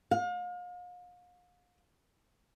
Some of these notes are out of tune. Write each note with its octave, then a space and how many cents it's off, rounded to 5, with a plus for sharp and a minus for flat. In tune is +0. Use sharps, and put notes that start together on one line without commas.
F5 +40